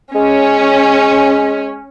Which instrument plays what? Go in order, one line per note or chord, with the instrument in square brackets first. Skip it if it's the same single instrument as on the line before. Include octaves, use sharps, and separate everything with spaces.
[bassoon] G#3 [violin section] C#4